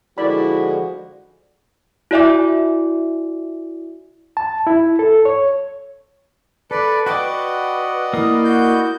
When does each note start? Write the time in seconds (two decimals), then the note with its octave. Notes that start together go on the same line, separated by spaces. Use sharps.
0.18 D3 F3 G#3 E4 F#4 A#4 D5 B5
2.11 E4 F#4 D5 E5 G#5 D6
4.37 A5
4.67 E4
4.99 A4
5.25 C#5
6.71 A4 B4 D5
7.06 F#4 B4 D5 D#5 F#5 G5 D6
8.13 A#3 E4 A#4 D#6
8.44 F#4 G6